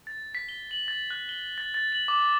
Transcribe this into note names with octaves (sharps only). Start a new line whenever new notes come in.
A6
B6
G7
F#7
A6
F#6
G7
A6
A6
F#7
D6
D6